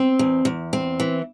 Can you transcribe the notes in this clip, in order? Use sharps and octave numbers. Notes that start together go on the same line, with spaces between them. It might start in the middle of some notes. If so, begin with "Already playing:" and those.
Already playing: C4
E2
E2
C4
E3